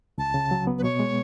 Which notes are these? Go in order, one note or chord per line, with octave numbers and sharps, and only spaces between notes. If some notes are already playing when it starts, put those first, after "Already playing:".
C#2 A5
C#3
F#3
B3
B4
B2 C#5
G#3